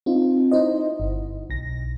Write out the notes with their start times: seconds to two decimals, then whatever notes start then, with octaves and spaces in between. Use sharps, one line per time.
0.06 C4 D#4 F4
0.51 D#4 E4 C5 D#5
1.00 G1
1.50 B1 A#6